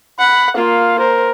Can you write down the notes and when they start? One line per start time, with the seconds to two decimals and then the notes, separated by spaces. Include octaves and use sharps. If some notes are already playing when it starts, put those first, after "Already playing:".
0.19 F#5 B5
0.56 A#3 F4 F5
0.99 A#4 C5